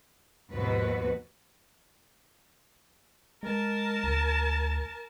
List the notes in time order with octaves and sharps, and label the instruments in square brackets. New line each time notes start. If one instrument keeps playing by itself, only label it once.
[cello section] D#2 G#2 B2 F3 F#4 B4
[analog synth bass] G#3 [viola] A#4 A5
[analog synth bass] D2